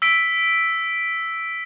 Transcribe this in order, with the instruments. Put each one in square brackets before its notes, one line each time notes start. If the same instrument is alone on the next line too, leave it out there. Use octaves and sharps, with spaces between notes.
[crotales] E6 B6 D7